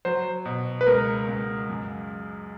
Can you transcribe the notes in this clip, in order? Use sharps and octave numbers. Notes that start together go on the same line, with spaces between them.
F#3 C5
B2
B4
C#2 A#4
C#2
F#2